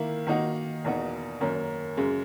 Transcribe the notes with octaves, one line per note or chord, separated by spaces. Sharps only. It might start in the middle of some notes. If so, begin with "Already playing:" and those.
Already playing: D#3 A#3 E4
D#3 A#3 D#4 F#4
E2 B2 A#3 D#4 F#4
F#2 D#3 A#3 C#4
F#2 C#3 G#3